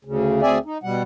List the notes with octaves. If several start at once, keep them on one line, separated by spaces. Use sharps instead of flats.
D2 C#3
D2 C4 G#4 D5 E5 G#5
D#4
B2 G3 F#5